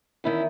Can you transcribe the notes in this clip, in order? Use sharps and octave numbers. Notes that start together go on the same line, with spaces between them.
E2 D#3 C#4 E4